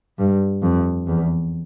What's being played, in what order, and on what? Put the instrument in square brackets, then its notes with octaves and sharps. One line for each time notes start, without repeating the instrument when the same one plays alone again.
[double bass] G2
F2
E2